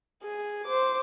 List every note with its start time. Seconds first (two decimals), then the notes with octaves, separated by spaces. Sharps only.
0.23 G#4
0.65 C5 D6